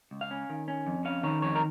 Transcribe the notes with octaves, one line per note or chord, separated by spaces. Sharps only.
C#2
F5
C#4
D#3
C#4
F2
C#4 F5
D#3 C#5
F2 C#5
A#4